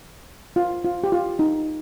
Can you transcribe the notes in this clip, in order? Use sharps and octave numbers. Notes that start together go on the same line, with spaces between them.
F4
F4
G4
F4
D#4